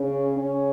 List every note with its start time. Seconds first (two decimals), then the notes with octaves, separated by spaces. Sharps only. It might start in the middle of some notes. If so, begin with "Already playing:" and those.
Already playing: C#3 C#4
0.36 C#3 C#4